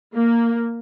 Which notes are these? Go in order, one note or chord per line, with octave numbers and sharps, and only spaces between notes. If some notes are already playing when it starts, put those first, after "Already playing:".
A#3